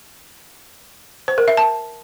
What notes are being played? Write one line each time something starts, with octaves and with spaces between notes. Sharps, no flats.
C5
A#4
E5
A5